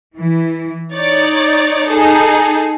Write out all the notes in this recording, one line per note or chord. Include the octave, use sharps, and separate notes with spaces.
E3
D#4 C#5 D5 A6
D#4 G#4 A4